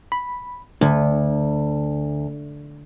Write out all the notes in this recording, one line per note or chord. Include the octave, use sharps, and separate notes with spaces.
B5
D2 D3